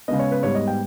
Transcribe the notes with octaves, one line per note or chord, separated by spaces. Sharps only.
C#3 G#3 B3 D#5
C#5
B4
G#2 G3 B3 C#5
D#5
G5